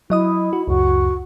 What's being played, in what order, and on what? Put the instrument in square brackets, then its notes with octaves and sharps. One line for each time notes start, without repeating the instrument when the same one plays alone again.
[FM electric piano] F#3 D#5 D#6 [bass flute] E4
[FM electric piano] F#4
[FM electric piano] C#2 F#2 [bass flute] F#4